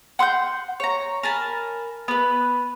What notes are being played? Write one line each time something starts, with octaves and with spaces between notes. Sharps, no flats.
F#5 C6 D6 G6
C#5 A#5
A#4 G#5 A5 B5
B3 B4